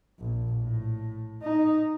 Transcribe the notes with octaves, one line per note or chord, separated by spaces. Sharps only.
A#1
A2
D#4